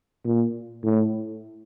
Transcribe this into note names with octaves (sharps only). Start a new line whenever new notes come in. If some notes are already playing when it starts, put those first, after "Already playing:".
A#2
A2